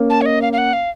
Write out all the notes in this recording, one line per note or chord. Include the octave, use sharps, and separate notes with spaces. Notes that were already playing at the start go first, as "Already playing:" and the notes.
Already playing: A#3 C#4
A5
C#5
D#5
F5
F5
F#5
F5